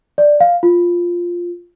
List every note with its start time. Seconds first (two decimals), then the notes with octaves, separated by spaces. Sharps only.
0.18 D5
0.40 F5
0.63 F4